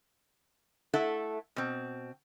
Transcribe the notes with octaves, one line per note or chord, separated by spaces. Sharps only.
A3 E4 A4 F#5
B2 C4